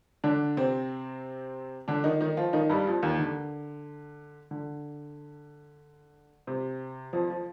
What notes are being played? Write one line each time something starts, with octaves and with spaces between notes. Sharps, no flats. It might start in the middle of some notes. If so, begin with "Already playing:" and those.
D3 D4
C3 C4
D3 D4
D#3 D#4
D#3 D#4
F3 F4
D#3 D#4
G2 G3
F2 F3
D#2 D#3
D3
D3
C3
F2 F3
F3